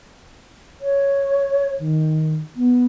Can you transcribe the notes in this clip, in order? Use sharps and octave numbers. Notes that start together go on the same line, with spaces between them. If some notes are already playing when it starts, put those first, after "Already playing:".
C#5
D#3
B3